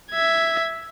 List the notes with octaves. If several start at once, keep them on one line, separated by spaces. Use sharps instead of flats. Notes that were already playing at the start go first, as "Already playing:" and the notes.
E5 G#6